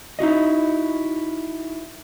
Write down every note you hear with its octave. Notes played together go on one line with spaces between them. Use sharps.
D#4 E4 F#4 D#5